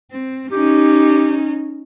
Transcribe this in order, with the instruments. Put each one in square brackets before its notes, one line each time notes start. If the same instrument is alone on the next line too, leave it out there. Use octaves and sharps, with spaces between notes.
[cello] C4
[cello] C#4 D#4 [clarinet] G4